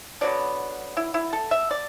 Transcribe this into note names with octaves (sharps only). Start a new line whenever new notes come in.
D3 F#3 B3 D5
E4
E4
A4
E5
D5